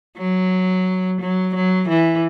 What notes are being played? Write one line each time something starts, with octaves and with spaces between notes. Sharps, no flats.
F#3
F#3
F#3
E3